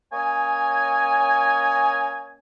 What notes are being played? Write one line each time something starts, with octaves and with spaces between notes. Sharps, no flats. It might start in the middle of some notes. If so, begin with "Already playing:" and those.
A#3 C#4 C#5 D#5 G#5